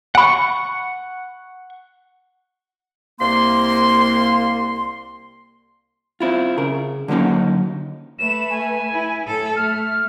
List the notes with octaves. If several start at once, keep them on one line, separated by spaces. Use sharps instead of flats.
F#5 G#5 B5 C#6
C2 A#3 C6
C4 E4 F4
C#3 A#4
D3 F#3 A#3 C#4 D#4
A3 B4 E7
G#5
E4
A2 A4
A3 F6